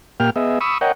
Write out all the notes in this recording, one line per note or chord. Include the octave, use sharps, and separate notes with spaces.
A#2 A#3 G4 G5 F6
B3 G#4 D#5 E5
B5 C#6 D#6 E6
A#4 C#5 D#5 F#5 G5